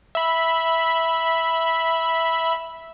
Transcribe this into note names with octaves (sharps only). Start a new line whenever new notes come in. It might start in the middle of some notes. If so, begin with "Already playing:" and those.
E5 B5